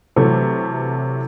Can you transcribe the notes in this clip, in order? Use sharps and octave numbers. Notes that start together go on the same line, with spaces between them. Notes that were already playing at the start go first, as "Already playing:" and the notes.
C3 E3 F#3 A3